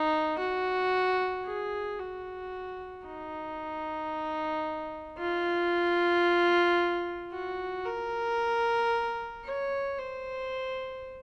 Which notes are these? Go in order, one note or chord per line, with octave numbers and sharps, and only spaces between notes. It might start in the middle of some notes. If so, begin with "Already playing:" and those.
Already playing: D#4
F#4
G#4
F#4
D#4
F4
F#4
A#4
C#5
C5